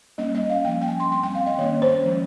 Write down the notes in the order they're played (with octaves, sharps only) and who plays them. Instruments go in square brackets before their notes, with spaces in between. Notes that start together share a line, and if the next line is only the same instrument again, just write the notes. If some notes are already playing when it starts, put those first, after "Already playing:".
[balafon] G3 A#3 C#4 D#5
D#5
F5
F3 A#3 C#4 G5
G5
G#5
C6
G3 C4 C6
G5
F5
D#5
D#3 A#3 C#4 C#5
C5
F3 G#3 C#4